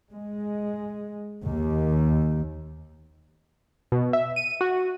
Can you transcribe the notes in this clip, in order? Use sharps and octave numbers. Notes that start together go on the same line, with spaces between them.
G#3
D#2
B2
E5
D#7
F#4